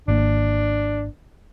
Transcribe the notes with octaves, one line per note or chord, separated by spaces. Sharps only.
G#1 A#3 D4